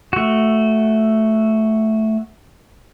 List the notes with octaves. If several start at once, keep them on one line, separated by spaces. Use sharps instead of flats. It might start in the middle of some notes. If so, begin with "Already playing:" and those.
A3 F#4